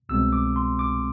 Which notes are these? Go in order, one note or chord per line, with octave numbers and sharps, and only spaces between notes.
C2 B2 G#3 C4 E6
D6
C6
D6